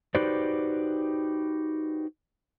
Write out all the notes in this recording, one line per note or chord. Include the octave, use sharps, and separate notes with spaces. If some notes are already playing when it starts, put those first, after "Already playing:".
D#4 F#4 G4 B4 C5 D5